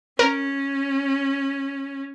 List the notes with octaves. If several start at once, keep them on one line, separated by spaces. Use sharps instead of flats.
C#4 A#4